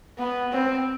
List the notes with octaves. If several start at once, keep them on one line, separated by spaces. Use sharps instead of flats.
B3
C4